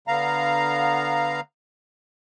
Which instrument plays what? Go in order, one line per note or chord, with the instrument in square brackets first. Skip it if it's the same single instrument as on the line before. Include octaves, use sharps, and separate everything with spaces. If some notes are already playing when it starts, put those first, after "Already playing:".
[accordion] D3 B3 F5 A#5